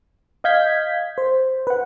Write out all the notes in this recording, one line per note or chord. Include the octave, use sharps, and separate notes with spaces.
D#5 F5 G6 G#6 B6
C5
B4 F#5